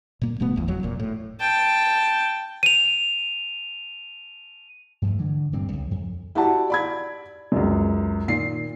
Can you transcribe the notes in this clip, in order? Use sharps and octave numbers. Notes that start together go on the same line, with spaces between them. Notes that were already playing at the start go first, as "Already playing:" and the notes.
A#2 A#3
D#1 B2 A3 B3
G1 E2
F#1 F2 F#3
E1 A#2
A2
G5 A5
D#7 F7
G2 F3 A3
D3 E3
D1 G2 A#2 C4
C#2
F2
E4 F#4 G4 D5 F#5 A5
D5 B5 G#6
C#2 F#2
A#2 D#3 C7